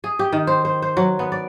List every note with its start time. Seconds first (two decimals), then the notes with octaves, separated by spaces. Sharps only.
0.04 G#4
0.19 G4
0.32 D#3
0.47 C5
0.65 C5
0.82 C5
0.97 F#3
1.19 B3
1.32 D5